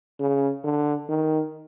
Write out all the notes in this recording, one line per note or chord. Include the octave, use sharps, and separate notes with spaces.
C#3
D3
D#3